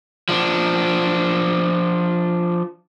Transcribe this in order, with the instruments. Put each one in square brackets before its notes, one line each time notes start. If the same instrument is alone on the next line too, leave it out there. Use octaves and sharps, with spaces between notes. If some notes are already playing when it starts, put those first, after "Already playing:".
[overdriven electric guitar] F3 D4